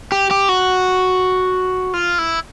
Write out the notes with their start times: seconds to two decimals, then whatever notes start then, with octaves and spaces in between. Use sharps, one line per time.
0.12 G4
0.31 G4
0.49 F#4
1.94 F4
2.19 E4